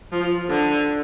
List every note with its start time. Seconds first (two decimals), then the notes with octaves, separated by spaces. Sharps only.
0.12 F3
0.50 D3